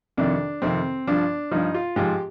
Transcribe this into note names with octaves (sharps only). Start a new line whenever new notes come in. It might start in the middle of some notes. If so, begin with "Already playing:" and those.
F2 C3 D#3 D4
F2 C3 D#3 C4
G2 F3 D4
G2 F3 D#4
F4
G#2 F3 G4